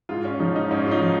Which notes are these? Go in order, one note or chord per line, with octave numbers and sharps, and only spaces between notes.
G#2 F4
C#4
F3 D#4
D#4
G#2 C#4
F4
D#4
F3